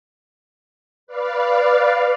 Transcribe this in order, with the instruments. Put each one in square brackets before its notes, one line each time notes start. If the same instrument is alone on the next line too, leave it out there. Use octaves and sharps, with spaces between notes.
[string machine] B4 D5 F5